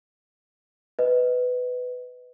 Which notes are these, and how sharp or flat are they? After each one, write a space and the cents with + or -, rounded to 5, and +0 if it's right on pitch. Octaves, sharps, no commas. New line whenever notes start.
B4 +15 D#5 +0